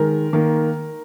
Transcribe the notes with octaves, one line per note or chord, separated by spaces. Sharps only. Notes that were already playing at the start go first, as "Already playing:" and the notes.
Already playing: D#3 G#3 A#4
D#3 A#3